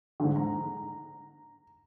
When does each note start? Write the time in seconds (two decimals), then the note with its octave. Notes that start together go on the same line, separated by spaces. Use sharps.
0.20 G#2 D3
0.36 A#5